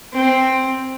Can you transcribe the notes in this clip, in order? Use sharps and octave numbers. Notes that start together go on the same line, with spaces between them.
C4